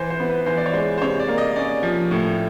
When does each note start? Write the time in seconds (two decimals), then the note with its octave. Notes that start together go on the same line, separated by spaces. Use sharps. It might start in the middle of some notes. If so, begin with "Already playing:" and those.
Already playing: E3 C5
0.10 C5
0.20 B3
0.29 B4
0.46 E3 C5
0.57 D5
0.66 C#5
0.74 G#3 C5
0.98 C5
1.02 C3 C#5
1.20 D5
1.28 A#3
1.38 D#5
1.56 C#4 D5
1.83 F3
2.11 A2